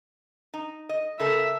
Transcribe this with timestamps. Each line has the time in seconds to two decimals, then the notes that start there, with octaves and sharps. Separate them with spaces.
0.54 D#4
0.89 D#5
1.20 C#3 A4 A#4 E5